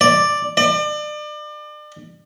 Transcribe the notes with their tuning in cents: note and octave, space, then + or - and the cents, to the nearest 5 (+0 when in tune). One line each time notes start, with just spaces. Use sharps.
D5 +5
D5 +35